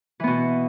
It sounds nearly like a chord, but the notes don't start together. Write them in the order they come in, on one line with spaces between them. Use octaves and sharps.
E3 B3 B2